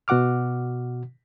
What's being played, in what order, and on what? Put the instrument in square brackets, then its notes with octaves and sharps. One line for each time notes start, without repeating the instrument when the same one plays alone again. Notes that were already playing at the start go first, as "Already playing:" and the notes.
[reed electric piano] B2 F#4 F#5 D6 F6